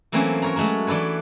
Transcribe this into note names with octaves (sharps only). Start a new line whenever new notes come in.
E3 F#3 A3 A#3 C4 C#4
A#4 C#5 A#5
F#3 G#3 A3 F#4 A#4
E3 D4 A4 B4 C#5